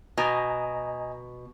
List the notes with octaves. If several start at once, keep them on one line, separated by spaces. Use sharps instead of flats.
B2 D#5 G#5 A#5